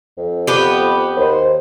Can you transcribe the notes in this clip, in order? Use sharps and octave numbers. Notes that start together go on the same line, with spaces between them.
F2
B3 G4
D#2 C5